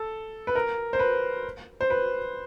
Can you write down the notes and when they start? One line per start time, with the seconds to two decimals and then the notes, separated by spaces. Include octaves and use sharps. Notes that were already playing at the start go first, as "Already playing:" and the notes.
Already playing: A4
0.47 B4
0.55 A#4
0.93 C5
0.99 B4
1.81 C5
1.90 B4